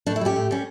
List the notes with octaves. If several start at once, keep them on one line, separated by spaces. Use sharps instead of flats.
A2 D4
E4
G3 C#4 G4
A2
G3 C#4